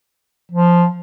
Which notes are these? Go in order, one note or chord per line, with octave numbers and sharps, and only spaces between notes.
F3